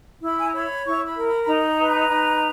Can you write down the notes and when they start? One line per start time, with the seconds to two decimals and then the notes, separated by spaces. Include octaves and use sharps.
0.22 E4 B5
0.39 G#5
0.46 A#5
0.53 C#5 B5
0.85 E4 C#6
1.05 B5
1.16 A#4
1.27 B5
1.43 B5
1.46 D#4 A#5
1.79 B4
2.09 D#4